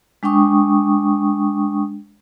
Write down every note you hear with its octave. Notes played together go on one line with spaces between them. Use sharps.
G#3 D4 G5 C#6 D#6